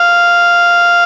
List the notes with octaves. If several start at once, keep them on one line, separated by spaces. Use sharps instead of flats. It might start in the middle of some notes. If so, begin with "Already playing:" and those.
Already playing: F5